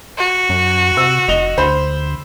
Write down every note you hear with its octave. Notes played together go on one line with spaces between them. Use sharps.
F#4
F#2
C3 E6
F1 D#5 F7 G7
D2 C5 B5